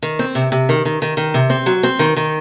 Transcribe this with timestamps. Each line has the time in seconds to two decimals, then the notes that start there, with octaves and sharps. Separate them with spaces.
0.02 D#3
0.19 C4
0.35 C3
0.52 C3
0.69 D#3
0.85 D#3
1.02 D#3
1.17 D#3
1.34 C3
1.50 C4
1.66 F#3
1.83 C4
1.99 D#3
2.16 D#3